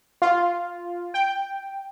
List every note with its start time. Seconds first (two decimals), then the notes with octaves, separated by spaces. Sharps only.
0.22 F4
1.14 G5